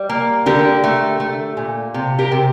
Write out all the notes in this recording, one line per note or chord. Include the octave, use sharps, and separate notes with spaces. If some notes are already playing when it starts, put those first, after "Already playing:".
Already playing: G3
A#3
D3 G4 A#4
A3
A3
A#2
C3
G4 A#4
C3